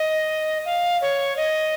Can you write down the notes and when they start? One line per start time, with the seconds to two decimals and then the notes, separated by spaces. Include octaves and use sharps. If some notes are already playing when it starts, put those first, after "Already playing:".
Already playing: D#5
0.65 F5
1.01 C#5
1.37 D#5